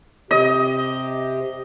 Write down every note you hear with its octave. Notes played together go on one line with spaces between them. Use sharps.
C3 G4 D#5